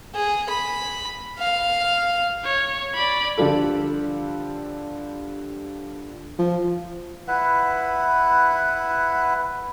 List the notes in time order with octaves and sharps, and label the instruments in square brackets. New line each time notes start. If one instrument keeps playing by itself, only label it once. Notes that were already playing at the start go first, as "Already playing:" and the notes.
[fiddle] G#4
B5
F5
[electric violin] C#5
D5 B5
[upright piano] D3 F3 G3 F4 A4
[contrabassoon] F3
[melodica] E4 B4 F#5